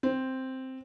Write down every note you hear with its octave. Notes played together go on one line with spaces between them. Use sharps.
C4